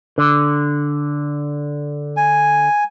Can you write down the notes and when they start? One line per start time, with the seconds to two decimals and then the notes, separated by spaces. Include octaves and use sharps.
0.18 D3
2.17 G#5